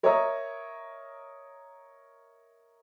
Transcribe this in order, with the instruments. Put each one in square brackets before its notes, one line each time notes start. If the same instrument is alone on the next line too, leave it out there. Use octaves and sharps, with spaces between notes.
[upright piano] A#4 C#5 D#5 E5 A#5 D#6